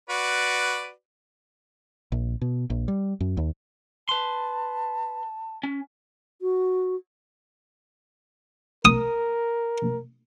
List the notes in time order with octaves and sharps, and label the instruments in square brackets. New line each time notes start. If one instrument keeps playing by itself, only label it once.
[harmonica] F#4 B4 D5
[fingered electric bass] A#1
B2
A#1
G3
F#2
D#2
[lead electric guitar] B4 C6 [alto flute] A5
[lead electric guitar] C#4
[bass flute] F#4
[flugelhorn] A#4 [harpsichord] D#6